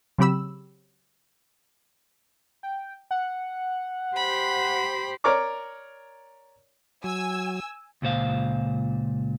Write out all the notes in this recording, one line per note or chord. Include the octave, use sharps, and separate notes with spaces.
C#3 F#3 C4 G4 B5 E6
G5
F#5
G4 C5 B5
A#4 C#5 D5 A#5 D6
F#3 G#5 E6
C#2 A#2 C5 F5